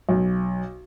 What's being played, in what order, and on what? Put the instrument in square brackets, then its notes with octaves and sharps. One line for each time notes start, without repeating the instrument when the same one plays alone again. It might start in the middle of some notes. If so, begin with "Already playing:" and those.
[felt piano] B1